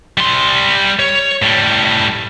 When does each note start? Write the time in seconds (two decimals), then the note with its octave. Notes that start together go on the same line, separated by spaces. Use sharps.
0.17 G3 C6
0.99 C#5
1.42 A2 G3